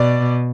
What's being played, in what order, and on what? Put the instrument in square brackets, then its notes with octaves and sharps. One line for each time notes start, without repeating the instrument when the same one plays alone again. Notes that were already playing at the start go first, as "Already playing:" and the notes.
Already playing: [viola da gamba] B2 [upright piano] D5